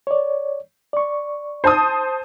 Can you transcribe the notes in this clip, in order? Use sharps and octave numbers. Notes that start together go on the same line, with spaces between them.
C#5 D5
D5 C#6
C5 A5 D#6